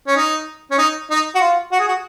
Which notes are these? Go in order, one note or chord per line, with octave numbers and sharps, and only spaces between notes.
C#4
D#4
C#4
D#4
D#4
F#4
F4
F#4
G#4
F#4